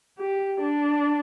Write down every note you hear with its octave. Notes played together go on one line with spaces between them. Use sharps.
G4
D4